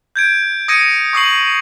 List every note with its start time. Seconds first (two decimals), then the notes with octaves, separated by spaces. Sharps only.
0.16 G6 G#6 D7
0.68 D#6 G#6 A#6 C#7 D#7
1.13 C#6 D#6 C7 F#7